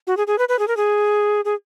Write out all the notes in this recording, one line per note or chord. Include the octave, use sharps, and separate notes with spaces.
F#4
G#4
G#4
B4
B4
G#4
A#4
G#4
G#4